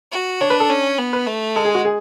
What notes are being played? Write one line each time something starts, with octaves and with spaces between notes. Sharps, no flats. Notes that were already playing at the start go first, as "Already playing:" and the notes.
F#4
D4 C#5
B4
A4
C#4
B3
B4
A3
G#3 A4
G#4
F#4
G#4